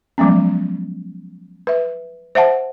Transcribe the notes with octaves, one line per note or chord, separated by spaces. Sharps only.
F3 F#3 G#3 B3 C#4
B4 E5
C5 E5 F#5 A5